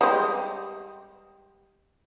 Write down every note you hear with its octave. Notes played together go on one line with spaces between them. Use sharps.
G3 G#3 C4